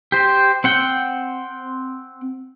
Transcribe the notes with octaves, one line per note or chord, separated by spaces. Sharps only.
G4 C5
C4 F#5 G5